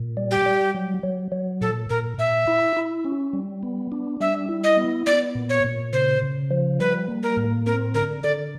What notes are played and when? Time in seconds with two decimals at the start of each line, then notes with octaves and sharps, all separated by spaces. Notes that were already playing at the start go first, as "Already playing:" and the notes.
Already playing: A#2
0.17 G3
0.31 G4
0.46 G3
0.75 F#3
1.03 F#3
1.32 F#3
1.61 A#2 A4
1.89 A#2 A#4
2.18 A#2 E5
2.47 E4
2.76 E4
3.05 C#4
3.33 G3
3.63 B3
3.92 D4
4.21 G3 E5
4.49 E4
4.64 D#5
4.77 B3
5.06 B3 D5
5.35 A#2
5.49 C#5
5.64 A#2
5.93 C#3 C5
6.22 C#3
6.51 F3
6.79 G3 B4
7.08 A#3
7.23 A#4
7.37 A2
7.66 C4 A#4
7.94 D3 A#4
8.23 D3 D5